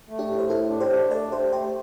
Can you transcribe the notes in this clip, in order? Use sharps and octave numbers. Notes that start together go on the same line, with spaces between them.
A3
D4 G4
A2
C5
A2 E4 A4
D4
G4 C5
D4
A3 A4 D5
A3 G4 C5
A3 G4 C5